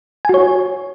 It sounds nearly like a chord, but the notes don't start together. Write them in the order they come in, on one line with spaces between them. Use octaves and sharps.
G#5 F#4 C#5